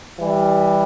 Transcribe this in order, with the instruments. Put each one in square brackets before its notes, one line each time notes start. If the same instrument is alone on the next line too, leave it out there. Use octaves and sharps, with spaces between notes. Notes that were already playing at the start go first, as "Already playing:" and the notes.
[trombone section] E3 G3